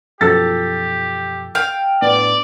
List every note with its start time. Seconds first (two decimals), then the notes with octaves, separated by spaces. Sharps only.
0.21 F#2 B2 F3 G4 A4 A6
1.55 F5 G5
2.02 A2 B3 D4 D5